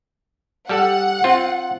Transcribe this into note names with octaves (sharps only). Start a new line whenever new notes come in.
G3 G4 A4 F#5
C4 F4